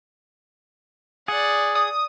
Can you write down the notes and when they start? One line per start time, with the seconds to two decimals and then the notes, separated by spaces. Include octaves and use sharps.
1.28 G#4 D5 F#5
1.75 D#6